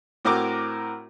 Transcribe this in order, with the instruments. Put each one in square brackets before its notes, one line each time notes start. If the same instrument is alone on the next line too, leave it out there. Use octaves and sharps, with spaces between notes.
[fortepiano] A2 C4 F#4 A#4 A#5 D6